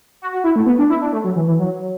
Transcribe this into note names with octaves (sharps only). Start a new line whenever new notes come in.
F#4
F#4
E4
A3
B3
D4
E4
D4
A3
F#3
E3
E3
F#3